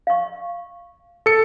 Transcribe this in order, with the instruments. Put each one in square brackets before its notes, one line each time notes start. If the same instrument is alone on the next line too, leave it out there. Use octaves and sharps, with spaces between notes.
[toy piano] F5 C#6
[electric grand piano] A4 C#7